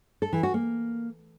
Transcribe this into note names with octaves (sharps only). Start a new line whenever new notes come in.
A4
E3
F#4
A#3